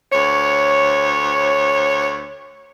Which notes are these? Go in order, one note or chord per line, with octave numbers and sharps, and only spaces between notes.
D2 C#5